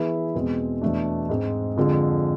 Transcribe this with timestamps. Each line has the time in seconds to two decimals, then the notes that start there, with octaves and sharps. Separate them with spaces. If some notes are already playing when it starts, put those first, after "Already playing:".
Already playing: E3 B3 E4 G#4
0.35 E2 B2 G#3 C4
0.81 E2 B2 A3 D4
1.29 G#2 G#3 C4
1.76 F2 D3 F3 G#3